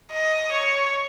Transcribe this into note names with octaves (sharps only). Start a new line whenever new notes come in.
D#5
C#5